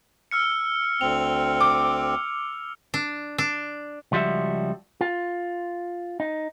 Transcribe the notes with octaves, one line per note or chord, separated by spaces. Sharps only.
E6 F6 C#7
D2 C4 F7
D6
D4
D4
C#2 F3 G3 F#4 E5
F4
D#4